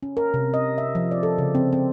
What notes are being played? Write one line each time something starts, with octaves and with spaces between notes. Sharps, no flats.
C#4
A#4
C3
D#5
E5
F3
D5
A4
C#3
C4
C4